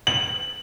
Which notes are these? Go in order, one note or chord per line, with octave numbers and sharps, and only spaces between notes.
F#7